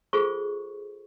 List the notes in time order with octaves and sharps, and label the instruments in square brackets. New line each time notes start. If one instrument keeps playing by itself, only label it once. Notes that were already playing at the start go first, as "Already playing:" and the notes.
[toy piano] F4 G#4 A4 C5 C#6